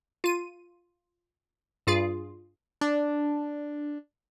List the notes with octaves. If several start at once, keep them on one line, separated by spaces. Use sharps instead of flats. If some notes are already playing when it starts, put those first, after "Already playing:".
F4 D#7
G2 F4 G#4
D4